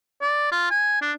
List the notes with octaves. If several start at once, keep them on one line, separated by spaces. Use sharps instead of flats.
D5
F4
G#5
D4